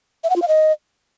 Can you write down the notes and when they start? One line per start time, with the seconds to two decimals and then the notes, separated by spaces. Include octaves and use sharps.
0.24 E5
0.30 F#5
0.36 F4
0.42 F5
0.48 D#5